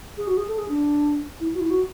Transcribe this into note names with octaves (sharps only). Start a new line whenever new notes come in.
G#4
F#4
G#4
A4
G#4
D4
E4
F#4
E4
F#4